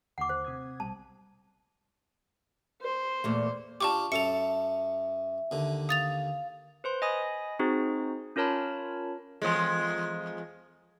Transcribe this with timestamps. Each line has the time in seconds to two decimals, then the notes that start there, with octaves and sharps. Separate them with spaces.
0.18 D#2 D3 A3 F#5 D6
0.29 C5
0.45 C3 D#6 G#6
0.80 A#1 B2 G3 A5
2.82 C5
3.24 E2 A#2 A3
3.81 D4 F4 G4 A5 C#6 D6
4.12 F#2 A4 E5 A5 C#7 F7
5.51 D#2 D3
5.89 F5 D#6 A6 F7
6.84 B4 C5 C6
7.02 D#5 G#5 B5 D#6
7.59 C4 D#4 F#4 G#4 C5
8.36 C#4 F4 A#4 C#5 A5 B5
9.42 E2 F3 G#3